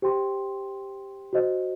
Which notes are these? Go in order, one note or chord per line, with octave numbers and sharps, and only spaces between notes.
G4 C5 G5 C6
F#4 C5 D#5